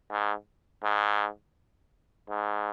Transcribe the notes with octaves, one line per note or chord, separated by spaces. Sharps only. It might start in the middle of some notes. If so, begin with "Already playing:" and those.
G#2
G#2
G#2